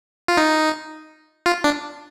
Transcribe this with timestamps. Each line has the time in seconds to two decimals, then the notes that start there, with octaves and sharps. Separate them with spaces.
0.28 F4
0.37 D#4
1.46 F4
1.64 D4